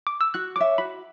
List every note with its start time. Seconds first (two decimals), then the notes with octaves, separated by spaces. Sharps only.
0.07 D6
0.21 E6
0.34 F#4 F#6
0.56 C#5 E5 D6
0.78 F#4 B5